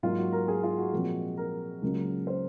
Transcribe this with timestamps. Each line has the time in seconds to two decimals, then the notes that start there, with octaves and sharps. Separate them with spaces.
0.03 G#2 F#3 A#3 F4
0.18 F#4
0.33 A#4
0.48 G#4
0.63 F4
0.78 F#4
0.93 A#2 F3 G#3 C4
1.38 A#4
1.82 C#2 C#3 F#3 A#3
2.27 C5